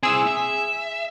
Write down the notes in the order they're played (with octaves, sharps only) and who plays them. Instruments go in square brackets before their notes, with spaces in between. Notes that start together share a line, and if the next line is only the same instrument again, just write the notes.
[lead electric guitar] C4 E4 [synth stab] G#4 E6
[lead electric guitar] E5